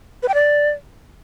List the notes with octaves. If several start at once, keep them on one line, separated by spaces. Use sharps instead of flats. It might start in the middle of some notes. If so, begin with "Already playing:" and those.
B4
G5
D5